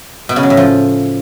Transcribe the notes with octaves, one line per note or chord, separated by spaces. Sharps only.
B2
C#3
F#3
A2
F3